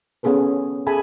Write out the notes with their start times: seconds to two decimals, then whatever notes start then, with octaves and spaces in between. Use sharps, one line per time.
0.23 B3 C#4 G#4 A4 B4
0.87 G#4 A4 E5 G#5 A5 B5